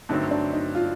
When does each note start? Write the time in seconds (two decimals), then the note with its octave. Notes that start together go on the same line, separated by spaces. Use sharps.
0.09 G2 D3 F#3 A3 C4 D#4
0.31 D4
0.53 D#4
0.75 F4